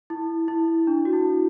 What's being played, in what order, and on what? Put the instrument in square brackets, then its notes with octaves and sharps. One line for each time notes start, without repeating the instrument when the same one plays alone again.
[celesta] E4
E4
D4
F#4
E4